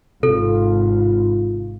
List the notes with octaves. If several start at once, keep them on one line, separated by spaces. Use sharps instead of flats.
G#1 C3 F4 A4